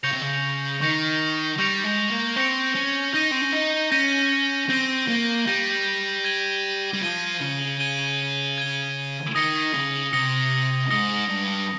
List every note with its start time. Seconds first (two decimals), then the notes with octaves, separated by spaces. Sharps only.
0.03 C#3 C#6 G6 A#6 C#7 F7
0.13 C3
0.22 C#3
0.81 D#3 C#6 G6 A#6 C#7 F7
1.58 G3 C#6 G6 A#6 C#7 F7
1.85 G#3
2.10 A#3
2.36 C4 C#6 G6 A#6 C#7 F7
2.75 C#4
3.14 D#4 G6 A#6 D#7 G7
3.32 C4
3.42 C#4
3.53 D#4
3.92 C#4 G6 A#6 D#7 G7
4.69 C4 G6 A#6 D#7 G7
5.08 A#3
5.47 G3 G6 A#6 D#7 G7
6.25 G#6 D#7 G7
6.94 G3
7.02 F3 G#6 D#7 G7
7.41 C#3
7.80 G#6 D#7 G7
8.58 G#6 D#7 G7
9.35 D#3 D#6 A#6 C#7 G7
9.74 C#3
10.13 C3 D#6 A#6 C#7 G7
10.90 G#2 D#6 A#6 C#7 G7
11.29 G2